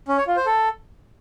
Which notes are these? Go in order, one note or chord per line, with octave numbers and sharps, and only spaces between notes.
C#4
C#5
F4
C5
A4